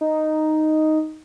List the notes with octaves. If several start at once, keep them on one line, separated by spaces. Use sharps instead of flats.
D#4